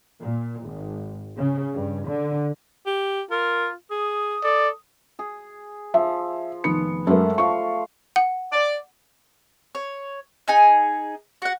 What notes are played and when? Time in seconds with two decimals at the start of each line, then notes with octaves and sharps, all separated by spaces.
0.20 A#2
0.64 G#1
1.38 C#3
1.74 G2
2.07 D3
2.86 G4
3.31 F4 A#4
3.91 G#4 D#6
4.44 A4 D5
5.19 G#4
5.94 F3 E5
6.64 F1 D#3 B3 C#7
7.07 F#2 G#3 A3 A#4 F#5 C6
7.38 F3 F5 C#6
8.16 F#5
8.53 D5
9.75 C#5
10.48 D#4 G#4 G#5
11.42 F#4 F#5